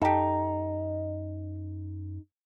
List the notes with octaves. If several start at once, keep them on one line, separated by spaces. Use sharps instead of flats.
F#2 D#4 G4 A4